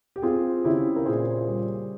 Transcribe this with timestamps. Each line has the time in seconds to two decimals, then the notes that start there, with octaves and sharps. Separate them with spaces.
0.16 G4
0.22 C4 F4 G#4
0.64 C#3 E4 G4
0.96 A#4
1.06 A#2 G#4 C5
1.47 G3